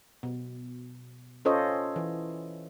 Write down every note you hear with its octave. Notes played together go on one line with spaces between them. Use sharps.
B2
C#4 F4 A4 C5 C#5 D#5
E3